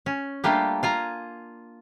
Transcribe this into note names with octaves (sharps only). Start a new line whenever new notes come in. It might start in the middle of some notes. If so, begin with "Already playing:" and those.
C#4
G3 A3 A#3 D4 F4 G4
F4 G#5 A#5